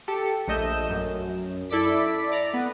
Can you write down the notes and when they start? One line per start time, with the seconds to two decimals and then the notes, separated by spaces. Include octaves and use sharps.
0.08 G4 A4 C#7
0.48 A#1 A3 D#5 G6 E7
0.90 F#2
1.70 E4 A4 D5 D6 B6
2.32 D5 A#5
2.54 B3